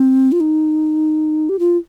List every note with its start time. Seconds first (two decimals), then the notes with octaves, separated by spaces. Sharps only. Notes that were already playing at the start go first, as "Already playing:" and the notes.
Already playing: C4
0.32 F4
0.40 D#4
1.49 G4
1.59 F4